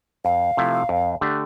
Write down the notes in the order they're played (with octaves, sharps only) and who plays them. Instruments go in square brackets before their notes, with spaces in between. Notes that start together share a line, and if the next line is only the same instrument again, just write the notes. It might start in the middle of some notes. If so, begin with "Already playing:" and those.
[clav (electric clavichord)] F2 [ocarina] F5
[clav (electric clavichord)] C3 F3 A3 E4
F2
D3 A3 D4 G4